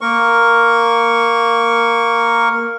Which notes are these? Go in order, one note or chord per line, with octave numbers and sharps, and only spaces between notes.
A#3 A#4 C#6